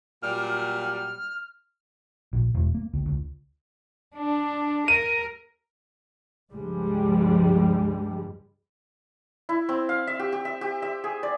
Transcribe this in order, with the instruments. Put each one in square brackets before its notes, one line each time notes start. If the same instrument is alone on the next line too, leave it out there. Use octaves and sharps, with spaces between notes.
[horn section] A#2 F#3 G3 [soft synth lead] F6
[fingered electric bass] A#1
E1
A#3
C#2
C#2
[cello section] D4
[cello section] A#4 [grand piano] D#7
[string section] C#2 G2 F3 G3 G#3
[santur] E4
C4
F5
E5
G4
G4
E5
G4
E5
G#4
D5